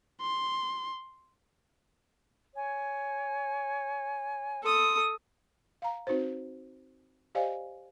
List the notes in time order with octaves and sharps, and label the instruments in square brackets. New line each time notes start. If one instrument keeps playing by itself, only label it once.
[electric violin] C6
[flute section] C#5 G#5
[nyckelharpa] A4 D#6 [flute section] C6
[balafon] F5 A#5
C4 D#4 F#4 B4 C5
G4 C5 D5 D#5 F5 G#5